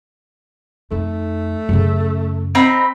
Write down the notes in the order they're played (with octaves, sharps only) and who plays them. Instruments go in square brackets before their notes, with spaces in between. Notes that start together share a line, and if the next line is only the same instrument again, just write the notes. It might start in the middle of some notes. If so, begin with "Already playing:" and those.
[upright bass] F2 D#4 [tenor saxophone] A3
[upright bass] F#2 C#3
[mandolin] C4 D#4 B5